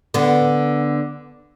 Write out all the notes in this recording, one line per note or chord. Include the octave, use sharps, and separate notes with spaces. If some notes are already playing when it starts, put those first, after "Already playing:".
D3 B3